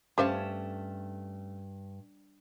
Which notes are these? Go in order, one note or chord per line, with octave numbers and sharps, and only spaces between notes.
G2 A3 C#4 G4 C5 F5 A5